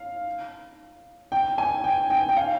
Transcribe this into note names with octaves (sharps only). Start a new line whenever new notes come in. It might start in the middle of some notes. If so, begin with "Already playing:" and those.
Already playing: F5
G5
G#5
G5
G5
G5
F5